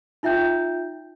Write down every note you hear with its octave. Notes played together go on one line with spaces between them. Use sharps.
D#4 F4 E5 G5 G6